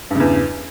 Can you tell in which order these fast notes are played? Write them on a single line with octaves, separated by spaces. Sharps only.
G2 C#3 E2